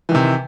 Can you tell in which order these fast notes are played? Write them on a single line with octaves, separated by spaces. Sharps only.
E3 D#3 C3